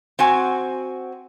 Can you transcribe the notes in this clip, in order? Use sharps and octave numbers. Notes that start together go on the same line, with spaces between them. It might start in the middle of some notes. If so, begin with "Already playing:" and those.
C4 F#4 G#5